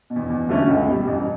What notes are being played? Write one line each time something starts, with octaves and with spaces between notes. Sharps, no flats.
B2
E2
E2
D3 A3 C#4
C#2
B2 G3
A1